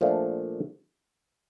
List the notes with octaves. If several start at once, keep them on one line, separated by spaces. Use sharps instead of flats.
A#2 F3 A3 D4